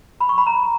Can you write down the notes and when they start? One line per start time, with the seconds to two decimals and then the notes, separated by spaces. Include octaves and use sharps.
0.20 B5
0.29 C#6
0.38 B5
0.46 A#5